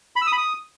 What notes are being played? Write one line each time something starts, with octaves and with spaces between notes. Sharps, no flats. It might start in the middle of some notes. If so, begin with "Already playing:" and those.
B5
E6
D#6
B5
D#6